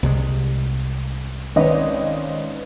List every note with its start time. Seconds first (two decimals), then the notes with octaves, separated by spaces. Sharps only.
0.03 C2 C3 G#3
1.56 G#1 C4 C#4 B4 C#5 D#5